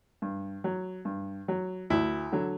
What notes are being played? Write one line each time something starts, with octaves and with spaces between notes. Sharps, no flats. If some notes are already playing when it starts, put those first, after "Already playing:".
G2
F#3
G2
F#3
D2 E4
D3 F#3